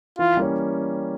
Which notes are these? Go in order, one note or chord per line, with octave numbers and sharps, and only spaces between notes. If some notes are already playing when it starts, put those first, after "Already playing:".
E3 F4
G3 A#3 C#4